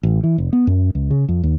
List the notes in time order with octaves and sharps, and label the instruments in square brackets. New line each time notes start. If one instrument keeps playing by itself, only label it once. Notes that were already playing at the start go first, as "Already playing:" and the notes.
[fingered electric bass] A1
E3
F1
B3
F#2
C#2
C#3
F2
D#2